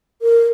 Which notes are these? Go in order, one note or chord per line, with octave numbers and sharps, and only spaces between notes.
A#4